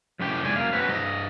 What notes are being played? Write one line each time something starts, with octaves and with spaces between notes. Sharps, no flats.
C2 F#2 A2 C#4 G4 G5
C2 G#2 G#3 D5 G#5
F#2 A#3 F5
C4 C#4 F#4 B4
G2 D#5